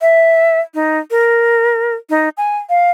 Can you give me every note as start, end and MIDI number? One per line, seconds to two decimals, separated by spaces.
0.01 0.60 76
0.74 0.99 63
1.11 1.94 70
2.10 2.29 63
2.37 2.58 80
2.69 2.91 77